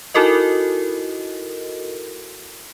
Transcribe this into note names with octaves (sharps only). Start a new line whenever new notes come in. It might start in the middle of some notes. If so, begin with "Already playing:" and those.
D#4 E4 F#4 A4 A#4 D#5